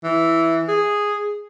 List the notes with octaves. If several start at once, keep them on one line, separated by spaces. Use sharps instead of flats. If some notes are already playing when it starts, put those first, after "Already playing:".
E3
G#4